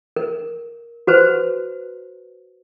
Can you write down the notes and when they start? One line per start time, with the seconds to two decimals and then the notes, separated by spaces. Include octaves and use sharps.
0.16 A#4
1.07 F#4 B4 C5